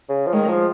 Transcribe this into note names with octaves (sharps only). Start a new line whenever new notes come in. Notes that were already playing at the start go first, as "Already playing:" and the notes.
C#3
F3
D#3 G#3
F3